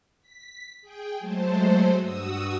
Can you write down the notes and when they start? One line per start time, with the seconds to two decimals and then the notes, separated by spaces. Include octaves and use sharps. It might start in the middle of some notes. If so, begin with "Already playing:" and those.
0.22 B6
0.81 G#4 G5
1.19 F#3 G#3 A3 A4 C5
1.95 G2 F#4 D#6 E6